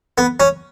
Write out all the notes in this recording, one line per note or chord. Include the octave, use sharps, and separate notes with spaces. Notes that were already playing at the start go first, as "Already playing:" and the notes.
B3
C#4